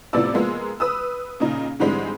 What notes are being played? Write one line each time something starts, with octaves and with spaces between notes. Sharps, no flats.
A2 C3 F3 B3 D5 E6
F3 G#3 A#3 B3
B4 D#6 E6
A#2 C#3 D#4
G#2 D3 E3 G3 G#3 C4